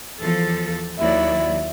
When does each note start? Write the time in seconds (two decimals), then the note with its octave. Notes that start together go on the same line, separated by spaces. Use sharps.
0.21 E2 F3 A4
0.99 D#2 F#3 E4 D5